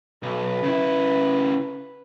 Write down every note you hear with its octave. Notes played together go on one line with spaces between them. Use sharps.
B1 B4
C#3 E4